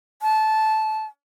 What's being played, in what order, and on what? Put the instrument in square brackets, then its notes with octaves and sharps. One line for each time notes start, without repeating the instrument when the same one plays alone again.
[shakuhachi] A5